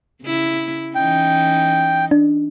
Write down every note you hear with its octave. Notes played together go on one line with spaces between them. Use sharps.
C#3 E4
E3 C#4 D#4 G5
D4